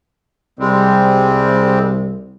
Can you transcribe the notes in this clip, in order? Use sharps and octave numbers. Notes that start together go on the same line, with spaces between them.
C2 G3 G#3 C4